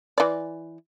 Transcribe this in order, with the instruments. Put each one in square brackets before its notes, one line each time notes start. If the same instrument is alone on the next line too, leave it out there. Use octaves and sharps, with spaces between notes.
[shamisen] E3 D5